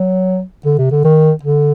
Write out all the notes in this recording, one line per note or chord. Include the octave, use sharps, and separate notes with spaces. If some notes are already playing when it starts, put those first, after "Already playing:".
Already playing: F#3
D3
C3
D3
D#3
D3